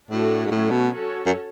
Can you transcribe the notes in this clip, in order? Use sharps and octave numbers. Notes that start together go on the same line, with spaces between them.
A2 A3 D4 F#4 A4 C#5
G#2
A2 F#3 A3 C#4
B2
C#4 F#4 A4 C#5
F#2